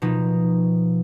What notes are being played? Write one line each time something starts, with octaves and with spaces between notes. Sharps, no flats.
B2 F3 D#4